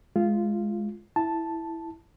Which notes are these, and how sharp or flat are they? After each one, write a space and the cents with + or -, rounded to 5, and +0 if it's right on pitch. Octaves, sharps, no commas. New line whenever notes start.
G#3 +10 F4 -10
E4 +0 A5 +0